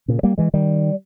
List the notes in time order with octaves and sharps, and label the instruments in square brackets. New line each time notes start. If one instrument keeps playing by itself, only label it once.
[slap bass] A#2 C#3
G3 A#3
E3 G#3
D#3 G3